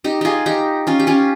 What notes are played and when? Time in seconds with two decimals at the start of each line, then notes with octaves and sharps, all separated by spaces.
0.04 D#4 G4
0.21 F4 G4 G#4
0.46 D#4 G4
0.87 C#4 F4
0.99 G4
1.07 C#4 F4